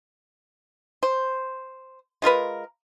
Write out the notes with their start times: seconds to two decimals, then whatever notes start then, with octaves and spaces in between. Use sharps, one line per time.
1.03 C5
2.22 G#3 F4 A#4 B4